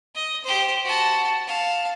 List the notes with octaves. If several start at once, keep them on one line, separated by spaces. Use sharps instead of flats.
D#5
G4 C5
F#4 A5
F5 A5